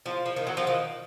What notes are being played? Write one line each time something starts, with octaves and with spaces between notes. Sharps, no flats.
F3
F3
D#3
F#3
F3
D#3